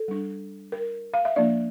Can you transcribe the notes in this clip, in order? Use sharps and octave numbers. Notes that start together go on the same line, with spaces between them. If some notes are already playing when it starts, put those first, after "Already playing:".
Already playing: A4
G3 D4
A#4
F5
E5
F3 A#3 D4 D5